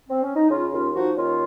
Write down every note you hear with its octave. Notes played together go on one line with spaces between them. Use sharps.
C4
C#4
D#4
C#3 C#4 F4
D#2 C#4 F4
F3 D#4 F#4
D#2 C#4 F4